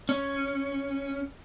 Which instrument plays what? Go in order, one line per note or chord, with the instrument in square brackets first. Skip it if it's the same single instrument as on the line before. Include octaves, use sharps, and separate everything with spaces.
[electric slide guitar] C#4